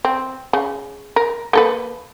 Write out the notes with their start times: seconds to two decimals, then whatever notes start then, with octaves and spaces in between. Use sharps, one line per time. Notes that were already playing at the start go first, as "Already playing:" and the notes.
0.05 C4
0.53 C#3
1.16 A#4
1.53 A#3 A4 B4